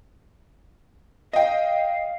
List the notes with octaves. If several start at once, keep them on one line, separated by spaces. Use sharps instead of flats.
D#5 F5 G5